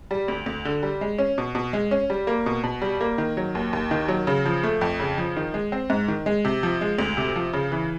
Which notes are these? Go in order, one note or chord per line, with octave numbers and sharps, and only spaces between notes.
G3
D2
D2
D3
G3
G#3
C#4
B2
B2
G#3
C#4
G3
A#3
B2
B2
G3
A#3
D#3
F#3
D#2
D#2
D#3
F#3
C#3
F3
A3
F2
C#3
F3
D#3
G#3
C4
G#2
D#3
G#3
C3
F3
G#3
D2
C3
F3
C#3
E3